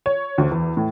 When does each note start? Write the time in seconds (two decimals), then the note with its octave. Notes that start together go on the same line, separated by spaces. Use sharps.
0.06 C#5
0.38 D2
0.51 E2
0.77 A2